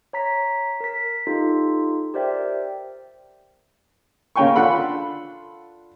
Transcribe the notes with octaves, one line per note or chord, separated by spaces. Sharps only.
C#5 A#5 B6
A#4 B6
D#4 F4 G4 A4
G4 A#4 C5 D5 E5 G5
C#3 A#3 C#5 G5 G#5 C#6
D4 F4 A4 F#5 B5 C6